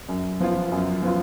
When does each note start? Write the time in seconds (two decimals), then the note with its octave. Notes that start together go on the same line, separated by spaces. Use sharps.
0.09 F#2
0.40 F3 B3 F4
0.72 F#2
1.03 F3 B3 F4